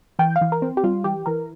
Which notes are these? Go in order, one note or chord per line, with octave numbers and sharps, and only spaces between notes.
E3 G5
F5
E3
A#4
C4
G4
G3 F4
E3 G4
E3 A#4